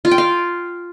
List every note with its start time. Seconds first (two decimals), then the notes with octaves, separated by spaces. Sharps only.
0.05 F4
0.11 G5
0.18 F5